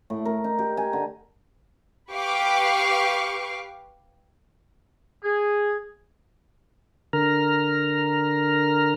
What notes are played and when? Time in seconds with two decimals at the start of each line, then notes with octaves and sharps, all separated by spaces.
0.10 A2
0.25 A#4
0.44 D#4
0.59 G4
0.77 G#5
0.93 D3
2.13 G4 B4 F5 C#6 D6
5.23 G#4
7.13 D3 A#4 A#5 F6